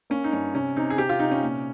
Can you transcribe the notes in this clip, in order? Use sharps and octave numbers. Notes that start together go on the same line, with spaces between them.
A#3 C#4
D#4
G2 C#4
C3 C#4
C3 D#4
G#4
C3 G4
F4
C3 D#4
C#4
A#2